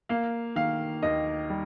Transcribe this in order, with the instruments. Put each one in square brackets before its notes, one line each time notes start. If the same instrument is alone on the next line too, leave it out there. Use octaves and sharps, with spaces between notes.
[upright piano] A#3 [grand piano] F5
[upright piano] D#3 [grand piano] F5
[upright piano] D#2 [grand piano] D#5
[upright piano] G3